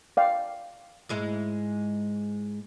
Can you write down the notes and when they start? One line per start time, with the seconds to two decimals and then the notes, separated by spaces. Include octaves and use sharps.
0.17 D5 F5 G5
1.09 G#2 G#3 E4